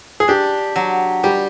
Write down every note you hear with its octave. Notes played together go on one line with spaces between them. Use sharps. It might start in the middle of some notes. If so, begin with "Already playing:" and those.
G#4
D4 G4
F#3
G3 G4